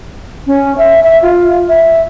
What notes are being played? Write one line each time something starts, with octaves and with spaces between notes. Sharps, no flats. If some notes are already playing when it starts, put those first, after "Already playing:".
C#4
E5
E5
F4
E5